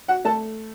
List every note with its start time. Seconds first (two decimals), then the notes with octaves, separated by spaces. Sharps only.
0.08 F#4 F#5
0.25 A3 A4 A5